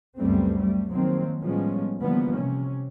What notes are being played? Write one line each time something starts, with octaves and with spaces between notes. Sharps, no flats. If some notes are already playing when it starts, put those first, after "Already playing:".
C#2 F#2 G3 A3 B3 C4
G3 A3
D#3 F3 F#3 A#3 C4
A2 F3 G3 G#3 B3 C#4
D3 E3 F3 G3 A#3 B3
C3 C#4